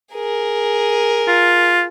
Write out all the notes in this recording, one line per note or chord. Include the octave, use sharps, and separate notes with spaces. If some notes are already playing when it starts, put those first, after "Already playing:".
G#4 A#4
F4